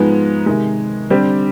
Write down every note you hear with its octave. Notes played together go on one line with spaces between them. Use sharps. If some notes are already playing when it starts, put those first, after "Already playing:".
Already playing: G#2 F3 G#3 B3 D#4
C3 D#3 G#3
D3 G3 C4 G4